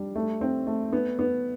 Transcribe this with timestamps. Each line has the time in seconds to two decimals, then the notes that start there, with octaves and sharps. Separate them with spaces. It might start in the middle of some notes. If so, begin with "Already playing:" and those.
Already playing: G3 D4
0.16 A3
0.41 C4
0.67 A3
0.92 B3
1.19 B3